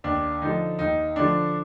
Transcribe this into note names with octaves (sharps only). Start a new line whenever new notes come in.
D#2 D4
D3 F3 D#4
D#2 D#4
D3 F3 D4